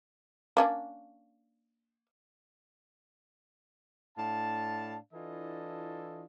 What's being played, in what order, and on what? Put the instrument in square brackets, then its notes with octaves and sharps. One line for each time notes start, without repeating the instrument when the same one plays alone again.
[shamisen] A#3 C#4 D4
[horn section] A2 D4 F5 A5
E3 D4 E4 F4 A4 D#5